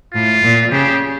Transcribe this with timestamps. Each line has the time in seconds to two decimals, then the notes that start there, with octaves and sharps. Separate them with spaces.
0.14 A2 F4
0.43 A#2
0.71 C#3 G4